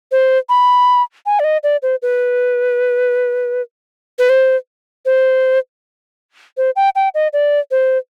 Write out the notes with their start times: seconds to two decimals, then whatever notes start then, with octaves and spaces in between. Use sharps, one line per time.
0.11 C5
0.49 B5
1.26 G#5
1.39 D5
1.44 D#5
1.63 D5
1.82 C5
2.02 B4
4.19 B4
4.29 C5
5.05 C5
6.57 C5
6.76 G5
6.95 G5
7.14 D#5
7.33 D5
7.71 C5